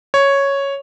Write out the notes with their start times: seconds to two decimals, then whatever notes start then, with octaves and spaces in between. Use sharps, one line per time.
0.14 C#5